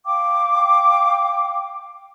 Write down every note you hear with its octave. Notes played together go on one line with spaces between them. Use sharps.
F5 G5 D6